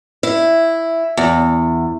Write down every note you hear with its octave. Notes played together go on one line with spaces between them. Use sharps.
E4
E2